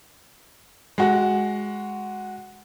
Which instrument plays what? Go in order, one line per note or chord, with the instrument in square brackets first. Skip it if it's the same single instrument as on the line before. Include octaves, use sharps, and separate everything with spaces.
[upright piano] G#3 F#4 F#5